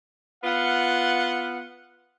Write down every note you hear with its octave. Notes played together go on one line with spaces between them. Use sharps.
B3 F4 F#5